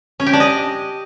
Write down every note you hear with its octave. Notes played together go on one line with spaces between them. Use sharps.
C#4
G4
D4
D#5